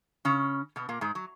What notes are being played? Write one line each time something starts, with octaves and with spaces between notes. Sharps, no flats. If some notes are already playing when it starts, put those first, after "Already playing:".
C#3 C#4
B2 B3
A#2 A#3
G#2 G#3
F#3